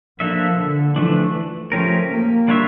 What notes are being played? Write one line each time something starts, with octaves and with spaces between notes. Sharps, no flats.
F3 A#3 D4 A4 E5
D3
E3 F3 A3 D4
F3 A3 C#4 G4 A#4
A#3
G3 D4 F4 C#5 E5